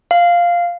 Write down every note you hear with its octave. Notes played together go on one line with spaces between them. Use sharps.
F5